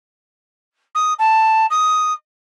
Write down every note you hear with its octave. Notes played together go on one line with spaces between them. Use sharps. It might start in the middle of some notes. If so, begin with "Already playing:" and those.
D#6
A5
D#6